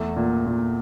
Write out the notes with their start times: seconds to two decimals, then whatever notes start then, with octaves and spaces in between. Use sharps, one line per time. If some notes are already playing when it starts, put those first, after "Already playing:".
Already playing: E2 A3
0.16 A#2
0.46 A#2